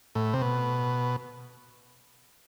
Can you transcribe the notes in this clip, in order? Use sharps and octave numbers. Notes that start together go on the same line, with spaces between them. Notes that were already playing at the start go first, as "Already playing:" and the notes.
A2
C3
B2